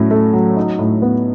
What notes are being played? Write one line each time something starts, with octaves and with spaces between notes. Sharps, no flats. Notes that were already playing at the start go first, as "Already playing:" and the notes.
Already playing: A2 F#3 A3 C#4
A3
F#3
D#4
A2
B3